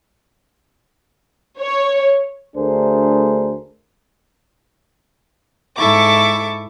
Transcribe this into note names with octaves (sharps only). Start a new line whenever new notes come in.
C#5
D2 A3 D4 G#4 A#4 C5
G#2 E4 A4 C#6 D6 A6